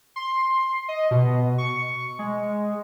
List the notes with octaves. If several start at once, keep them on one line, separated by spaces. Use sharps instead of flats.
C6
D#5
B2
C#6
G#3